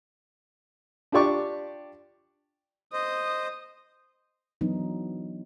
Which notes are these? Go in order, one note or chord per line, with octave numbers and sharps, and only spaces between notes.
D4 F4 G4 D5 C#6 D6
C5 D#5 D#6
E3 F#3 B3 D4 D#4